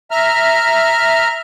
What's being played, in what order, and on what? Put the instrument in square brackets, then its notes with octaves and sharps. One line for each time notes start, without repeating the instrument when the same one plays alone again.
[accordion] E5 A#5 F6